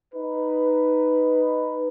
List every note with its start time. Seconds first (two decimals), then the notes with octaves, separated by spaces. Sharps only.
0.14 D#4 B4